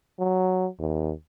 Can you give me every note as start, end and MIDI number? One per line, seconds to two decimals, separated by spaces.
0.19 0.67 54
0.80 1.12 39